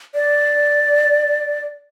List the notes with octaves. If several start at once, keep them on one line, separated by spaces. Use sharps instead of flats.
D5